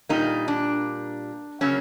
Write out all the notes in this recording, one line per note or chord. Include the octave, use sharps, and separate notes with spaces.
A#2 G3 A#3 D#4
D4
C#3 F#3 A#3 C#4